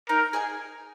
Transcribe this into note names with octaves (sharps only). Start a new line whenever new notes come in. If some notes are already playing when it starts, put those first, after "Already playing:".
D#4 A#4
G#4 D#5 G#5